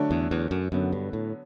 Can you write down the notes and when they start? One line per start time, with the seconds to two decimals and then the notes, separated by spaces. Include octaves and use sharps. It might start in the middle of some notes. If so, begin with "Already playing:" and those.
Already playing: D3 F#3 A3 D4
0.11 E2
0.31 E2
0.51 F#2
0.72 F#2 D3 F#3 B3
0.92 G2
1.13 A2